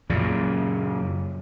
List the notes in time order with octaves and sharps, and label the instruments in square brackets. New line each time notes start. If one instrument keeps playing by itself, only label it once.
[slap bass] F#2 A#2 C#3